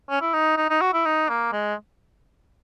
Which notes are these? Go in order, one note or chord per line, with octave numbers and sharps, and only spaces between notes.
C#4
E4
D#4
D#4
D#4
F#4
E4
D#4
A#3
G#3